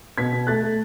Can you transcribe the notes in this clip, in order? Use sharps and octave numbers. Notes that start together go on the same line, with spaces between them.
B2 G#6 B6
B2
A3 F#6 A6
A3